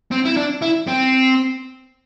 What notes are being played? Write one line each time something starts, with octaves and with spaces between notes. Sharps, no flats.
C4
E4
D4
E4
C4